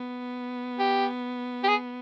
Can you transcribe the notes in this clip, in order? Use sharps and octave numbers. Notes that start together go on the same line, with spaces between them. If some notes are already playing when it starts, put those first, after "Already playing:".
Already playing: B3
G4
G4
G#4